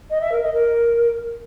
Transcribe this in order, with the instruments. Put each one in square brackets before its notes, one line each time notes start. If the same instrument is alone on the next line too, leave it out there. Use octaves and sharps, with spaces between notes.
[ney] D#5
E5
A#4
D#5
A#4